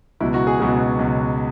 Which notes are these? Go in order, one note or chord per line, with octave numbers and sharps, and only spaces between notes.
C#2 B2 F#3 E4
F#4
G#4
C#2 B2 F#3 G#4
C#2 B2 F#3